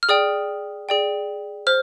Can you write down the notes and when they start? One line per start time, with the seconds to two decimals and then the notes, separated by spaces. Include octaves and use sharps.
0.03 F6
0.09 G#4 D5 G5 D#6
0.89 G#4 D5 G5
1.67 C5 F6